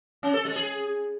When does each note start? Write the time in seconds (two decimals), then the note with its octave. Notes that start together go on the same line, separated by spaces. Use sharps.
0.23 C#4
0.34 A4
0.45 G#3
0.56 G#4